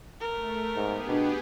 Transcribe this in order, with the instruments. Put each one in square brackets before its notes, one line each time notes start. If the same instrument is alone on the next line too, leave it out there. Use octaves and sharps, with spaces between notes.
[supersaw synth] A3 [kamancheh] A#4
[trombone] G#2 [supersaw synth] B3 G4 G#4
[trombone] B2 [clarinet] D4